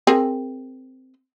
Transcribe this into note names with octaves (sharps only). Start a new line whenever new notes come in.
C4 G#4 A#4